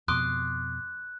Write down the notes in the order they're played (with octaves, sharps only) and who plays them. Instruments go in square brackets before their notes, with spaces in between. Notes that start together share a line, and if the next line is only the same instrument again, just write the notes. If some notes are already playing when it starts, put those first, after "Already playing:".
[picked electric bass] F2 B2 [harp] C6 D6 D#6 [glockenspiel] F#6